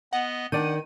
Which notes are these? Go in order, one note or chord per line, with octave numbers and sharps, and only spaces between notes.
B3 D#5 F#5
D#3 D4 D5 F#5 G6 D#7